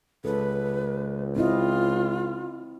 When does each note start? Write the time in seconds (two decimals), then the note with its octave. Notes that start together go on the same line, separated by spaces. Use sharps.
0.25 C#2 A4 B4
1.36 C4 E4 F4 D#5